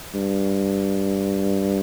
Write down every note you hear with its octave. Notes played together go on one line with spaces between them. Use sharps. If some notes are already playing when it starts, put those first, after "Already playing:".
G2